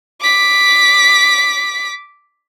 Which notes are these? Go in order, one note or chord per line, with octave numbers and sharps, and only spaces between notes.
D6 B6